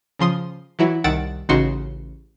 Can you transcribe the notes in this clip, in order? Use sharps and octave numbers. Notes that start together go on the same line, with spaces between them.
C#3 F3 C6 D#6
E3 F#3 E4
C2 D#3 F#5 E6 A6 D7
A1 C#3 D#4 F#4 C6 C#6